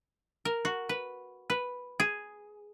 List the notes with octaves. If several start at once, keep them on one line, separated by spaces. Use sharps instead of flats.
A#4
F#4
B4
B4
G#4